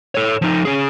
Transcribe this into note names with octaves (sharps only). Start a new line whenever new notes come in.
A4 C#5
F3 D#4
C#4 G#4